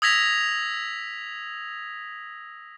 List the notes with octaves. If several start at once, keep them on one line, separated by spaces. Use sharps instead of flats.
D#6 E6 G#6 A#6 B6 F7